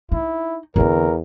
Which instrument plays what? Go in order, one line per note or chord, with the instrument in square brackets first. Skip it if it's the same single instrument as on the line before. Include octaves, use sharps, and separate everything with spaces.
[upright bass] D#4 [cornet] E4
[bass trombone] E2 [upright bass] D3 C4 [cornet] A#4